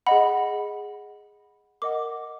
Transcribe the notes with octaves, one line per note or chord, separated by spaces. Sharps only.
G#4 D#5 F#5 B5
A#4 D#5 F#5 D6